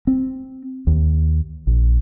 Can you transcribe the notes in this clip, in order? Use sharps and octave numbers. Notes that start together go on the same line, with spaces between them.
C4
D#2
A#1